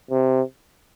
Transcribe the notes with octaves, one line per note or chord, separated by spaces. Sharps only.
C3